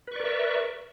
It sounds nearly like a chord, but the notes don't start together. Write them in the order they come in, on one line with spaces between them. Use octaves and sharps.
B4 C#6 D5 A#4 E5